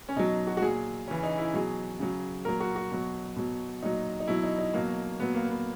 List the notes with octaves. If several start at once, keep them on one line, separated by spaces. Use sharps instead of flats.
C#4
B2 F#3 D#4
F#4
F#4
A#2 F#3 G#4
C#3 E3 C#4
D#4
E4
B2 F#3 G#4
C#3 F#3
A#2 F#3 A#4
F#4
F#4
B2 F#3
B2 F#3
A#2 F#3 D#4
D#4
B2 F#3 E4
D#4
D#4
B2 F#3 A#3
A#2 F#3 B3
A#3
B3